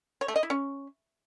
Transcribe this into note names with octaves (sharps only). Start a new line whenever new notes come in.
C#5
A3
D#5
E4
C#4